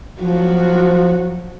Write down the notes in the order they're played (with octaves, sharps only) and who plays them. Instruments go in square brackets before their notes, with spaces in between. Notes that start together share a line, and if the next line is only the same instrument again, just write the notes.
[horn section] F3 [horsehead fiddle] F#3 F#4